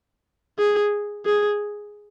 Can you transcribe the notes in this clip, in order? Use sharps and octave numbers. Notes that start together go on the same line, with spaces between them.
G#4
G#4